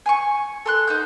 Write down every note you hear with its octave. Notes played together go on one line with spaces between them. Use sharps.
G#5 C6 C#6
A4 C6 F#6
D#4 F#5 G6